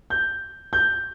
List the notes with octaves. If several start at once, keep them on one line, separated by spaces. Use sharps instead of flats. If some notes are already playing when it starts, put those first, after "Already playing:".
G6
G6